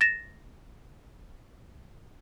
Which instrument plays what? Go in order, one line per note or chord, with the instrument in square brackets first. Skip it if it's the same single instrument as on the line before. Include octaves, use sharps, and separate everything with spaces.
[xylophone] A6 A#6 E7